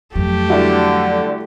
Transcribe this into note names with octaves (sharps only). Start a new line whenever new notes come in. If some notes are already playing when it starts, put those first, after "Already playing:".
F2 F#3 A3 G4
D3 G3 E4 F#4